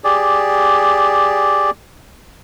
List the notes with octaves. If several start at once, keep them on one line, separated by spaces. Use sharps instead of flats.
G4 G#4 D5